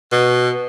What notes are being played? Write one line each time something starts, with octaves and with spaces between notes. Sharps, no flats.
B2